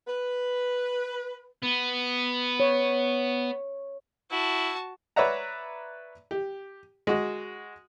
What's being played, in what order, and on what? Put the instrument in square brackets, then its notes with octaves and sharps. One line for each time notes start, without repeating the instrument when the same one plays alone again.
[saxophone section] B4
[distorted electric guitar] B3
[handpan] C#5
[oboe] E4 [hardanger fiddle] F#4 A5
[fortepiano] B4 C#5 D5 E5 F#5 A#5
G4
G#3 F#4